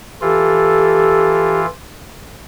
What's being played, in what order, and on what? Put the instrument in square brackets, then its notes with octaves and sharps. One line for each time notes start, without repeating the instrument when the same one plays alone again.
[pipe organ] E3 F4 [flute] G4 [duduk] A4